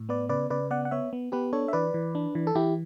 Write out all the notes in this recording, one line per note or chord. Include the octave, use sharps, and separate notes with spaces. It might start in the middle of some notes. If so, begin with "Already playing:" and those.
Already playing: A2
B3 B4 D5
C#3 B4 D5
C#3 B4 D5
B3 D5 F#5
F#5
B3 C#5 E5
B3
B3 G4 B4
D4 A4 C#5
E5
E3 B4 D5
E3
D4
E3
A4
E3 E4 G4